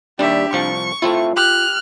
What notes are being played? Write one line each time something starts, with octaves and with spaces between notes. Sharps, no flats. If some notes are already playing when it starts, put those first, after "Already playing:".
D#2 G3 D4 G4 E5
C2 F3 C#6
A3 C4 E4 F4
G4 F6 F#6